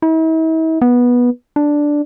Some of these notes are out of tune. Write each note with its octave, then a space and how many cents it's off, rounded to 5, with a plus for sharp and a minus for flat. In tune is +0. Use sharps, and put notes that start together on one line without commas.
E4 -45
B3 -15
D4 +0